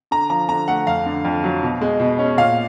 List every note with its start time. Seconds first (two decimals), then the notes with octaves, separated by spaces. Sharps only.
0.11 D3 A#5
0.30 F3 A#5
0.49 D3 A#5
0.68 A3 F#5
0.87 F2 F5
1.06 D3
1.25 F2
1.44 F#3
1.63 B2
1.81 G#3
2.00 B2
2.19 C#4
2.38 A#2 F5